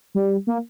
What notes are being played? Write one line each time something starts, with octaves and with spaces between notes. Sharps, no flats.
G3
A#3